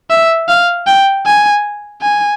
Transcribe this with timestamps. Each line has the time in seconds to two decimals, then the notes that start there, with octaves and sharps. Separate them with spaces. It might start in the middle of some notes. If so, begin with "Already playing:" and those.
0.10 E5
0.49 F5
0.87 G5
1.26 G#5
2.02 G#5